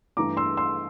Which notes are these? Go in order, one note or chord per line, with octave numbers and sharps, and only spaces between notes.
G2 E3 A3 D4 A#5 D6
C6 E6
C6 E6